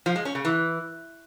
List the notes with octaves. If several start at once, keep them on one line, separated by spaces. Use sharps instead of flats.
F3
G#3
C#4
C#3
E3